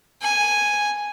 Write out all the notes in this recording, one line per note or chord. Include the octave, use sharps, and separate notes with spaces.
G#5